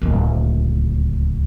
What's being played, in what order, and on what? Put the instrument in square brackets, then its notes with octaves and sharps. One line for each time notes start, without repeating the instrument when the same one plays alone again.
[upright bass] D1 C#2